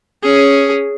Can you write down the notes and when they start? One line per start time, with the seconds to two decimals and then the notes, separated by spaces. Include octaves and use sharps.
0.23 C#4 G#4